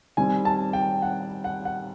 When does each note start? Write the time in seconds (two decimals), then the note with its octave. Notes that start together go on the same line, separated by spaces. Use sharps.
0.17 D#3 G3 C4 G#5
0.45 A5
0.73 G5
1.02 F#5
1.44 F#5
1.65 F#5